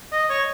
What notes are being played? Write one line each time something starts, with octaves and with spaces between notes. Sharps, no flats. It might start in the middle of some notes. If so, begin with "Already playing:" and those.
D#5
C#5